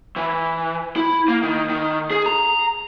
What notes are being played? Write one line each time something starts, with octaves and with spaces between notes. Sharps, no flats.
E3
E4
A#3
D#3
D#3
G#4
A#5